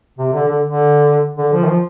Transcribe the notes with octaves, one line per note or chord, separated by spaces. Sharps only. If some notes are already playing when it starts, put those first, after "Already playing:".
C3
D3
D3
D3
D3
F3
D#3
F3